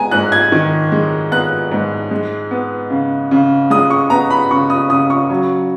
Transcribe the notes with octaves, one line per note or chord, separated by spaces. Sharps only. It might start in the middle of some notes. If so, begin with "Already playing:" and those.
Already playing: G#3 B3 G#5 A#5
G#2 F#6
G#6
D#3
G#3
B3 F#6
G#2
G#3
B3
C#3
C#3
G#3 D#6
C#6
B3 A#5
B5
C#3 C#6
D#6
C#3 D#6
C#6
F#3